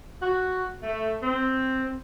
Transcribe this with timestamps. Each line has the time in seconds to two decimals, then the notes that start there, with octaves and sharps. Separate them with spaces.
0.22 F#4
0.82 A3
1.23 C4